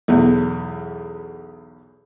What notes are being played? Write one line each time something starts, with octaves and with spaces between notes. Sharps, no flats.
B1 E2